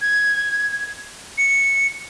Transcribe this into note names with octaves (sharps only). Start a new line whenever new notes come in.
G#6
C#7